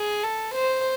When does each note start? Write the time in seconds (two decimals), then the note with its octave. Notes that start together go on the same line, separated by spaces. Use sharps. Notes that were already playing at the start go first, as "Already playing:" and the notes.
Already playing: G#4
0.23 A4
0.55 C5